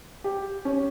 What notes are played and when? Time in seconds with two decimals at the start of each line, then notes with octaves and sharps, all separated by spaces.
0.24 G4
0.65 C#4